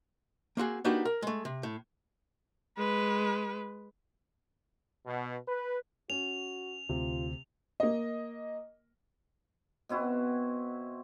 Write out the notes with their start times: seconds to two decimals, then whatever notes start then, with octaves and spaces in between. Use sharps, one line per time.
0.57 A#3 C4 F#4 G#4
0.85 A#3 D4 D#4 F#4 G4 B4
1.05 A#4
1.22 G#3 A3
1.45 C3
1.63 A2
2.77 G#3 B4
5.06 B2
5.47 B4
6.10 C#4 F#4 F7
6.89 D2 C3 F4
7.80 A#3 D#5
9.89 B2 C4 E4 F#4